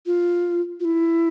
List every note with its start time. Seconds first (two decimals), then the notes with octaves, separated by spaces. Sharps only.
0.06 F4
0.80 F4
0.85 E4